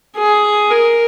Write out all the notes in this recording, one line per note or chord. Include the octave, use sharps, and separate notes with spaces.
G#4
A#4